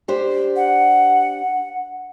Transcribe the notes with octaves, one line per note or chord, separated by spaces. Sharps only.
D4 G4 C5
F#5